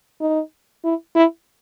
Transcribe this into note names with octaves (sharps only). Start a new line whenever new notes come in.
D#4
E4
E4